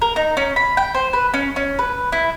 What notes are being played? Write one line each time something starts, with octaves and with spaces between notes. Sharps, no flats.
A#4
D#4
C#4
B5
G5
C5
B4
C#4
C#4
B4
E4